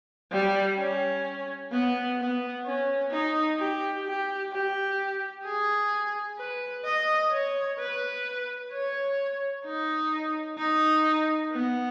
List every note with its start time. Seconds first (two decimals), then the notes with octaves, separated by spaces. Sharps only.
0.32 G3
0.78 C#4
1.72 B3
2.18 B3
2.65 C#4
3.11 D#4
3.58 G4
4.05 G4
4.52 G4
5.45 G#4
6.38 B4
6.85 D#5
7.32 C#5
7.79 B4
8.72 C#5
9.65 D#4
10.59 D#4
11.52 B3